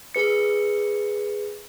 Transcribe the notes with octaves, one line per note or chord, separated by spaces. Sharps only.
G#4 B4 C#7